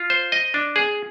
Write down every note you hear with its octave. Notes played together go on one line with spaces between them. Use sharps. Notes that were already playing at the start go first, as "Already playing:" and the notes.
Already playing: F4
C5
D#5
D4
G#4